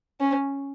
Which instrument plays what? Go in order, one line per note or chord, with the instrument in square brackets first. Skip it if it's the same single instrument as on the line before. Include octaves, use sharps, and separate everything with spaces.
[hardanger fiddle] C#4